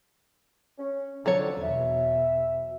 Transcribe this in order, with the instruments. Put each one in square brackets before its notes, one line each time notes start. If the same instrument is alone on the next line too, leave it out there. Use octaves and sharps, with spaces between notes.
[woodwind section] C#4
[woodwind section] F2 [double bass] D3 [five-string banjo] F#3 A4 C#5
[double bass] E2 B2 [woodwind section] E5